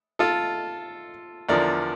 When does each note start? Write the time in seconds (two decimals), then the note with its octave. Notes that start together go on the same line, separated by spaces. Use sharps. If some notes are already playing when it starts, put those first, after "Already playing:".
0.19 F4 A4
1.49 E2 D3 F3 A#4 D5